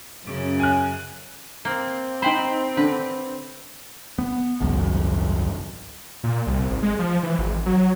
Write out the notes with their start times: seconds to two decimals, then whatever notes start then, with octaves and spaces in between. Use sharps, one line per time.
0.25 F#2 C#3
0.60 G#5 F#6
1.65 A#3 C4
2.22 D#4 C5 G5 B5
2.77 D3 B4
4.19 B3
4.61 G#1 C#2 F#2
6.23 A#2
6.47 C2
6.70 G#1
6.83 G#3
6.99 F3
7.23 E3
7.39 G#1
7.66 F#3